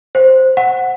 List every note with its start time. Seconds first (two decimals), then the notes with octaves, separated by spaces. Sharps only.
0.15 C5
0.57 F#5